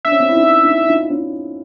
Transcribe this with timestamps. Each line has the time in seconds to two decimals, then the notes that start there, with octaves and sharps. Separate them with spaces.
0.05 D4 E5
0.12 C#4
0.20 C4 D4
0.29 E4
0.36 C#4 D#4
0.65 D#4
0.69 D4 E4
0.90 D#4 F4
1.10 C#4 D#4